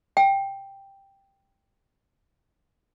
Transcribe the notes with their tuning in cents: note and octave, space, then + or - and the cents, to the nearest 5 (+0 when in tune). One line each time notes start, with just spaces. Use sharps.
G5 +5